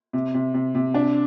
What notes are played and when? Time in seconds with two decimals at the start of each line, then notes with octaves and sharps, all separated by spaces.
0.13 C3
0.34 C3
0.54 C3
0.75 C3
0.94 D4